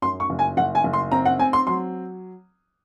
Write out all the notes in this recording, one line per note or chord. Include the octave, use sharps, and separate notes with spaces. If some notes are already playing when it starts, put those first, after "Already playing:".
F#2 C6
C#6
F#1
G#5
F#1 F#5
G#5
F#1
C6
C4 A#5
F#5
C4 G#5
C6
F#3 C6